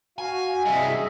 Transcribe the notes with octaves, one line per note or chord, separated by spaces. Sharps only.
F#4 F5 G#5
G2 C3 G#4 D#5 E5